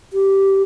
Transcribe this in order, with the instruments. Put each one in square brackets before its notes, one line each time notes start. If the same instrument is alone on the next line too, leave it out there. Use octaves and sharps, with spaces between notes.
[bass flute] G4